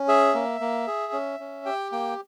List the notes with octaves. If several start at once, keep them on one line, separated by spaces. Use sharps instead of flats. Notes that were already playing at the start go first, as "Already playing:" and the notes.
Already playing: C#4
G#4 E5
A#3
A#3
G#4
C#4
C#4
G4 G5
A#3 G5